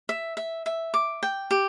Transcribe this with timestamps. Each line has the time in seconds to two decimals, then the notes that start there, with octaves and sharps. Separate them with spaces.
0.09 E5
0.37 E5
0.66 E5
0.94 D6
1.23 G5
1.51 G4